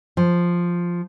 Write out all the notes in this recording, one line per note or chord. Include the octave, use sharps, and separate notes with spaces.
F3